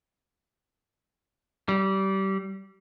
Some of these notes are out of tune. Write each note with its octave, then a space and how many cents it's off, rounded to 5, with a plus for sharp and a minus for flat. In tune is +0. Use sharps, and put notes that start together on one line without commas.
G3 -25